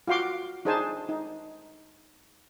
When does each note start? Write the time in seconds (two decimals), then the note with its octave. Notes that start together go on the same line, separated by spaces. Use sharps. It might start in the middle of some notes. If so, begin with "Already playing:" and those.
0.07 F4 F#4 F5 C6 D6
0.65 D4 D#4 G#4 C5 G#5 A5
1.09 D#4